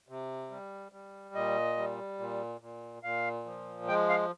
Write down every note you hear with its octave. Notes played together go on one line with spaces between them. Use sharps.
C3
G3
G3
A#2 D#5
G3
A#2
A#2
A#2 F5
F3
G#3 G5
F5